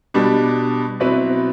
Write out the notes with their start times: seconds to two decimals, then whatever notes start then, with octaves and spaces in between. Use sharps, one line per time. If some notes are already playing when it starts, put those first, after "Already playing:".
0.14 B2 G3 D4 G4
1.00 B2 F#3 C4 E4 B4